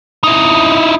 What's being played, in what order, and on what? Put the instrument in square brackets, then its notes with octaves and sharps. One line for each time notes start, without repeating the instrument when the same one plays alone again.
[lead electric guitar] D#4 E4